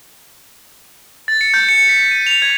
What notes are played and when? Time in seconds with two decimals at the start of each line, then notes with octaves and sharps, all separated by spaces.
1.28 A6
1.41 C#7
1.54 G6
1.69 C#7
1.89 B6
2.11 D#7
2.27 F7
2.42 G#6